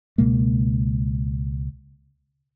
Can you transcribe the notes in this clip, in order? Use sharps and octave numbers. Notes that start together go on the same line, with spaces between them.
C#2 B2 G#3 A#3